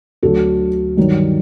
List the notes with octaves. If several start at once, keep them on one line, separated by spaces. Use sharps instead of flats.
D2 D3 F#3 F#4 A4
G2 D#3 F#3